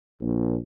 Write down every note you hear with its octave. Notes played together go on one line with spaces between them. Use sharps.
A#1